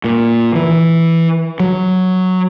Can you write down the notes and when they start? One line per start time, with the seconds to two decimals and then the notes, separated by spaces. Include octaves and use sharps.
0.04 A#2
0.55 E3
1.60 F#3